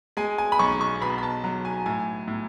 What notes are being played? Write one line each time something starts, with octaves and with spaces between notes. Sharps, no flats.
G#3 G#5
G#5
B5
B1 C#6
C#6
B2 B5
B5
A5
F#3
G#5
A2 G#5
A2